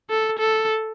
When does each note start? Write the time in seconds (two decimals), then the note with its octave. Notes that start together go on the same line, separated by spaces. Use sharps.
0.10 A4
0.39 A4